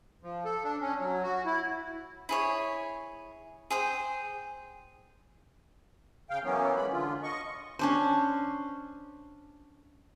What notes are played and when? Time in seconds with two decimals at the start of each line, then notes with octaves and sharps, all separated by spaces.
0.23 F3
0.45 A4
0.64 D4
0.81 C#4
0.98 F#3
1.23 F#4
1.46 E4
2.29 E4 G#4 C#5
3.70 G#4 C5 G5
6.30 C#3 F5 G5
6.44 E3 F#3 A#3 B3 C#4
6.76 G#3 B5
6.92 D3 F4
7.23 D#5 C#6
7.79 C#4 D4 C5